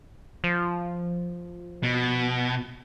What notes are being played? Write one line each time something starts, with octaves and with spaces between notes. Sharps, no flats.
F3
B2